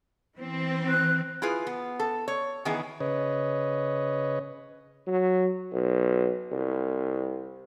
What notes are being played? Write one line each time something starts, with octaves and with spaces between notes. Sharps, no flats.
E3 C4
F#6
E4 F4 G#4 B4
B3
A4
C#5
D#3 E3 B3 E4 G#4
C#3 B4 C#5 D#5
F#3
B1
C2